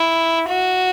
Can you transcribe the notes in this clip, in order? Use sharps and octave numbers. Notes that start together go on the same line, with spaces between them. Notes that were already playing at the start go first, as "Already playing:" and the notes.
Already playing: E4
F#4